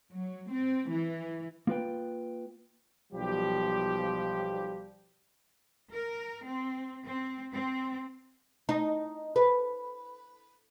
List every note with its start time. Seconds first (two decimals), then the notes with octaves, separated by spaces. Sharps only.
0.12 F#3
0.52 C4
0.90 E3
1.67 A#3 F4 B4 G5
3.13 B1 F3 G3 G4
5.92 A#4
6.45 C4
7.06 C4
7.54 C4
8.69 D#4
9.36 B4